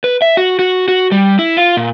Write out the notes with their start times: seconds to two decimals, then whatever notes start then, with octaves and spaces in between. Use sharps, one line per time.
0.04 B4
0.22 E5
0.37 F#4
0.59 F#4
0.88 F#4
1.12 G3
1.39 E4
1.57 F4
1.77 A#2